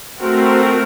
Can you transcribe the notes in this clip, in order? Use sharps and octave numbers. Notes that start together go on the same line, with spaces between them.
A3 C4 F#4 A#4